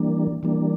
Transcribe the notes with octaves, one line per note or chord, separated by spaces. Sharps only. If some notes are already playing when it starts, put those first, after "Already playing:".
Already playing: E3 G3 A#3 D4
E3 G3 A#3 D4